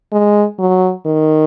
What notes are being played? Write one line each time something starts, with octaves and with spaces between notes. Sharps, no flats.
G#3
F#3
D#3